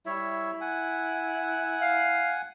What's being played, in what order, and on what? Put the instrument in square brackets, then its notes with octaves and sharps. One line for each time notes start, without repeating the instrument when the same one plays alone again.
[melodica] G3 C#5 E5 [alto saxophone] E4
[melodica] F#5 G#5
[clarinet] F5